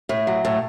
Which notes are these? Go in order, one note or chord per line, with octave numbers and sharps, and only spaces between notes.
A2
F#3
A2